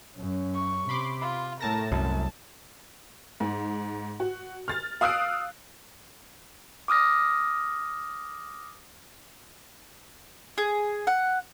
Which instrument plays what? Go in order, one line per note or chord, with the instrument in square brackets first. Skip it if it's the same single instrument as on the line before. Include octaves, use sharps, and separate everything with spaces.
[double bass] F#2 C#4
[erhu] C#6
[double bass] C3 [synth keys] B5 C6 D6
[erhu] F4
[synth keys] A2 A5 A#6 [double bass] A3 [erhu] A#4
[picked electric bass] C2 [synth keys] F#2 [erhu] A5
[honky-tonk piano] G#2
F#4
F6 A6
F5 D#6 E6 F#6 C7 D7
[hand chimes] D6 D#6 F6 A#6
[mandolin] G#4
F#5